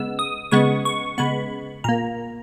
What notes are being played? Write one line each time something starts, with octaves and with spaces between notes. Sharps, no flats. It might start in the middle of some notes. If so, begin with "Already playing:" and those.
Already playing: C#3 G#3 B3 E6
D#6
C#3 G#3 B3 C#6
C#6
C#3 G#3 B3 B5
A#2 A#3 A#5